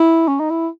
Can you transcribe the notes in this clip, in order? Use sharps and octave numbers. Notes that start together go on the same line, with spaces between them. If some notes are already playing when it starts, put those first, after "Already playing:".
Already playing: E4
C#4
D#4
E4